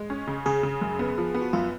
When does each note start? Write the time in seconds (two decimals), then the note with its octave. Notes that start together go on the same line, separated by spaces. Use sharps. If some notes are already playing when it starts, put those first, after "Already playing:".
Already playing: G#3
0.10 C#4
0.27 C#3
0.46 C#3 G#4
0.63 C#3
0.81 F#2
0.99 B3
1.18 F3
1.35 B3
1.42 F#4
1.53 F#2 F4